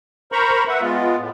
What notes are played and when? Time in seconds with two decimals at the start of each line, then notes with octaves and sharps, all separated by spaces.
0.32 A#4 C5 A#5 B5 C#6
0.68 B4 E5 F#5
0.81 G#3 B3 F4
1.18 A2